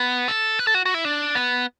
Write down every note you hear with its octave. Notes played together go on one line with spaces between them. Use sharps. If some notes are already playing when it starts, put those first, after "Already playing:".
Already playing: B3
A4
B4
A4
F#4
F#4
E4
D4
B3